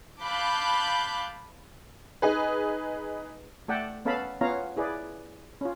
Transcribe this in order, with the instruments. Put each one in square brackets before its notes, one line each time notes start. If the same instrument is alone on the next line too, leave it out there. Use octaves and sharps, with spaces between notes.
[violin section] F5 A5 B5 D6 F#6 G6
[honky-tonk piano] D#4 G#4 B4
[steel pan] A3 A4 D5 F#5 G5 A5
B3 C#4 A4 F5 A5 B5
B3 C#4 F4 C#5 F5 A#5
E4 G#4 B4 D5
C#4 F4